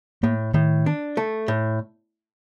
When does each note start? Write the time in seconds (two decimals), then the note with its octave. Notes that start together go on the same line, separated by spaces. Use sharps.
0.23 A2 A#3
0.54 A2 D#3
0.86 D4
1.17 A3
1.48 A2